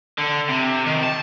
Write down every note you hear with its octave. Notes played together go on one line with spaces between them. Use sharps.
D3
C3
D#3
A5